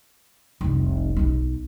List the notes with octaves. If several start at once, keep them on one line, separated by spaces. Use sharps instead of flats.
F1 C2
B1 D#4